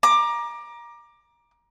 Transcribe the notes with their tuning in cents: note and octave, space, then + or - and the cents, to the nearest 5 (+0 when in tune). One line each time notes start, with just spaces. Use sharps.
A#5 +25 D6 +20